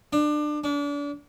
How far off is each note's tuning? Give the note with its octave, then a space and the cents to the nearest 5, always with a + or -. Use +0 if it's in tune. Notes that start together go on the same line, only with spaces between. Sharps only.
D4 +25
D4 -35